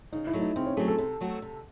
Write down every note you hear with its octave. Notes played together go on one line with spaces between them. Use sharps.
C#3 D#4
E4
F#3 A3
D#4
C#3 C4
C#4
F#3 A3 G#4
A4
C3
F#3 A3 C4 F#4
C3